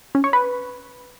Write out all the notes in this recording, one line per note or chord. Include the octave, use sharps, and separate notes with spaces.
C#4
C#5
B4